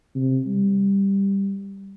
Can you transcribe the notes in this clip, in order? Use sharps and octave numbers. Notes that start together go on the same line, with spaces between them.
C3
G3